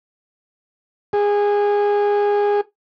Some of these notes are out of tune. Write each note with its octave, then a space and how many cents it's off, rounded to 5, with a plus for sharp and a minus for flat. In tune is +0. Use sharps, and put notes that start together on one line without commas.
G#4 -20